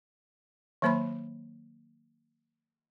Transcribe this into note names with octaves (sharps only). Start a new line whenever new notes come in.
D#3 F#3 A#3 C5 B5 C6